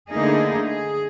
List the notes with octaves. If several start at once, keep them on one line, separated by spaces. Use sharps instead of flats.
D3 A3 A#3 D#4 E4 G#4
G#4